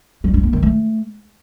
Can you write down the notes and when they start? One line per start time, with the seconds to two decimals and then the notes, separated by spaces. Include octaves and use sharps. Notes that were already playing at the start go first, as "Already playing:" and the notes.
0.24 G3
0.34 D4
0.43 A#3
0.53 D#3
0.63 A3